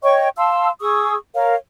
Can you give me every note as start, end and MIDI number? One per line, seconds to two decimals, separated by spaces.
0.03 0.28 73
0.03 0.28 75
0.03 0.28 79
0.03 0.28 85
0.37 0.69 77
0.37 0.69 81
0.37 0.69 84
0.37 0.69 88
0.81 1.15 68
0.81 1.15 85
0.81 1.15 87
0.81 1.15 88
1.34 1.55 70
1.34 1.55 73
1.34 1.55 77